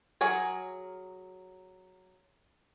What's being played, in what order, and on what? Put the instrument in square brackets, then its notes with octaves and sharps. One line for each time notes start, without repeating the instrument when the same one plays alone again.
[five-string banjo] F#3 G#4 A#4 C#5